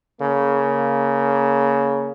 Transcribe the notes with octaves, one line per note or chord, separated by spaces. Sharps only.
C#3 A#3